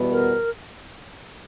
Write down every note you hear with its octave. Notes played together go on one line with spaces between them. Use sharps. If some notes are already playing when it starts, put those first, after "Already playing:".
Already playing: E2 B2 G3 B3
A#4